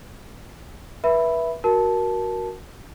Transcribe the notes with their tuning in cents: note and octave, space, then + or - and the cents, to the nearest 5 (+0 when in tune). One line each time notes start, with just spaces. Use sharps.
B4 -25 E5 +0 B5 +0
F#4 +0 A#4 +10 A5 -10